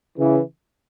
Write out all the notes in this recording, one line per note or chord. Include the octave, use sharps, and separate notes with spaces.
C#3 E3